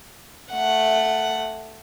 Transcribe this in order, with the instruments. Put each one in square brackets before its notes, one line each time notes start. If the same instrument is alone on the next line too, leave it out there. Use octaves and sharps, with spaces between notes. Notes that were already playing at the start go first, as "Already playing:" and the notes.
[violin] A3 F#5